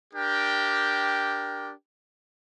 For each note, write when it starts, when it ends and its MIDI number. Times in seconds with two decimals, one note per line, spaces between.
0.14 1.71 62
0.14 1.71 67
0.14 1.71 70
0.14 1.71 79